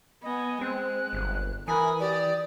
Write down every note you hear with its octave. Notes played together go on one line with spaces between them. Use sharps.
B3 D#5 G#5
G#3 C4 F#6
G1
E3 A#4 G#5 B5 D#6
G4 D5